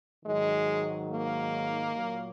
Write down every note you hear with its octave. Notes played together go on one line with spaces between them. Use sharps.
G#2 D#3 F#3 G#3
A#3
A#2 F#3